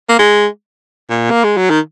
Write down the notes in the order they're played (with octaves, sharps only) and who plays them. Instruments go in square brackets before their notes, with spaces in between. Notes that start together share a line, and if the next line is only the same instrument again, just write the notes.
[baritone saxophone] A#3
G#3
A#2
A#3
G#3
F#3
D#3